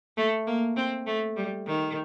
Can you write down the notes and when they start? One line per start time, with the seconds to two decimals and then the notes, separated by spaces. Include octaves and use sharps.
0.17 A3
0.47 A#3
0.76 C4
1.06 A3
1.36 G3
1.67 D#3